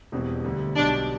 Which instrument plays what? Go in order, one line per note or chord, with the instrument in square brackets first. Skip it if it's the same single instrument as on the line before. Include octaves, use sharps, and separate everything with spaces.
[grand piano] E1 E2 B2 G3 C4
D2 D3 G3
[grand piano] B1 B2 G3 [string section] D4